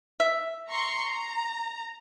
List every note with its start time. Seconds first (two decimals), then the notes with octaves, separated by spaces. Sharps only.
0.20 E5
0.68 A#5 C6 C#6
1.05 A#5